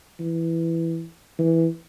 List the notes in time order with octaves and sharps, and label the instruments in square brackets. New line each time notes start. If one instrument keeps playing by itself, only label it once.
[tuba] E3
E3